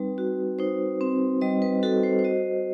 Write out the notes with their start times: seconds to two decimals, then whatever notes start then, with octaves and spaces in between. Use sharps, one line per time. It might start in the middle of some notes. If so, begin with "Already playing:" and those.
Already playing: G3 C4 D#4 B4
0.18 F#4
0.59 D#4 C5
1.01 C4
1.41 G3 D#5
1.62 B4
1.83 F#4 A4
2.03 C5
2.19 C5
2.24 F#4 D#5